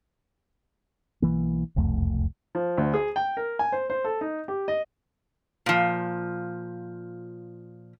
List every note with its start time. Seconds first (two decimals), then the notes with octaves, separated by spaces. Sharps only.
1.22 B1 E3 A#3
1.76 E1 C2 F2 A3
2.55 F3
2.78 D2
2.94 G#4
3.16 G5
3.37 A#4
3.59 G#5
3.72 C5
3.90 C5
4.04 A4
4.21 D#4
4.48 G4
4.68 D#5
5.66 A#2 F3